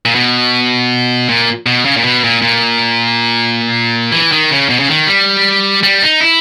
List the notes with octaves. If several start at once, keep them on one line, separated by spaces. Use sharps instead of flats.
A#2
B2
A#2
B2
C#3
A#2
B2
A#2
A#2
E3
D#3
C#3
B2
C#3
D#3
G3
G3
D#4
E4